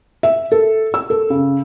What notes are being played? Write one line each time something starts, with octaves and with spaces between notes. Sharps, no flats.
E5
A4
E6
A4
C#3